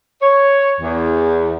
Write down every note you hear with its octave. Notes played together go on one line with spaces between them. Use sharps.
C#5
E2